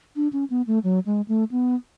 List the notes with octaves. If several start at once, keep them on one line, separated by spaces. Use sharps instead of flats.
D4
C#4
B3
A3
F#3
G#3
A3
B3